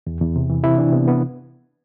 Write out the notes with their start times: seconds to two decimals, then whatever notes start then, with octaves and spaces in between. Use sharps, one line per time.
0.07 E2
0.21 E2
0.36 C3
0.50 E3
0.64 C3 E4
0.78 E3 D4
0.93 C3 B3
1.08 B3